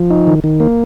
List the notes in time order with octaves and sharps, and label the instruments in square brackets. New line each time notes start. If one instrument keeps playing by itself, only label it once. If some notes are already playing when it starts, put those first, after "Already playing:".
Already playing: [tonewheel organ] F3
D#4
D#3
D#3
A#3